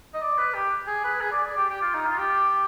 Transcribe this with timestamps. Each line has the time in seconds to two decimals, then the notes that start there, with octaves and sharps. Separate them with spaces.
0.14 D#5
0.22 D5
0.38 B4
0.54 G4
0.87 G#4
1.04 B4
1.21 G#4
1.32 D5
1.44 D5
1.57 G4
1.70 G4
1.82 F4
1.94 D#4
2.06 F4
2.18 G4